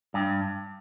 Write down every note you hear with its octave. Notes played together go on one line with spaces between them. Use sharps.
G2